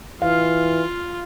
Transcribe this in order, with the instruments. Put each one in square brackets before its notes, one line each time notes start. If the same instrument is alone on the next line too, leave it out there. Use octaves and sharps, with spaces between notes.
[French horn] E3 [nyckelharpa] F4 [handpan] F5